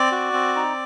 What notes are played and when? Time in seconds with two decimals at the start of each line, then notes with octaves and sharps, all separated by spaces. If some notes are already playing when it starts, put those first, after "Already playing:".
Already playing: C4 D5 D6
0.12 F#4
0.33 C4
0.56 D#4